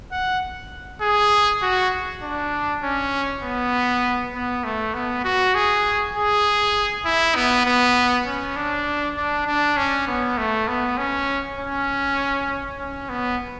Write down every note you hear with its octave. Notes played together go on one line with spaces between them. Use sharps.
F#5
G#4
F#4
D4
C#4
B3
B3
A3
B3
F#4
G#4
G#4
E4
B3
B3
C#4
D4
D4
D4
C#4
B3
A3
B3
C#4
C#4
C#4
B3